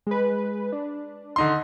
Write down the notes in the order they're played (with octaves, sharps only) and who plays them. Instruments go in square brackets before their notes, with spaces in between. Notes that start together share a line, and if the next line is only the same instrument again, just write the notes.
[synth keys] G#3 B4
D4
[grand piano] D3 D#4 C6